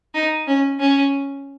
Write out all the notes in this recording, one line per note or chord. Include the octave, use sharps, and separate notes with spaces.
D#4
C#4
C#4